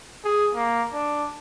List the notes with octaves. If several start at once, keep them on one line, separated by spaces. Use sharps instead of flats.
G#4
A#3
D4